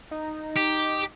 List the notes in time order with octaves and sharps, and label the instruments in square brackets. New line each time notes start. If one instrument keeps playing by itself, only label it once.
[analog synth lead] D#4
[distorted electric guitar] G4